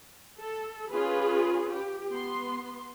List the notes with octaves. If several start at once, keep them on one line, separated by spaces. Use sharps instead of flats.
A4
C#4 F4 G#4 B4
G4
B3 C6